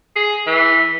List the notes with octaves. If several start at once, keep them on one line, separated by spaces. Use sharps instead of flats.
G#4
E3